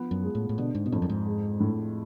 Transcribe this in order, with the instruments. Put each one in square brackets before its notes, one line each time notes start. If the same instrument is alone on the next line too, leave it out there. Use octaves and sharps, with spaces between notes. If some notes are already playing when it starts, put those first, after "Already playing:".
Already playing: [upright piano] F3 B3
[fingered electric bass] F#2
[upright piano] G#3
[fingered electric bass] A2
A2
[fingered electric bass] B2 [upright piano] D3
[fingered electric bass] G#2
B2
[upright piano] F2 [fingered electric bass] A2
[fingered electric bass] F#2
G#2
[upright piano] G#3
A2